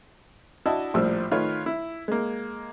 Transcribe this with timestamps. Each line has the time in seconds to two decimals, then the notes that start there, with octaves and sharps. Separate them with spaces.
0.65 D4 E4 F#4 D#5 E5 A5
0.94 A#1 A2 F3 G3 E6
1.32 D#3 A3 F4 B4 C#5
1.66 E4
2.08 G#3 A#3